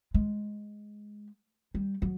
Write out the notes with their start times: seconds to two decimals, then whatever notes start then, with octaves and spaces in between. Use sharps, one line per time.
0.14 G#3
1.74 G3
2.02 F#3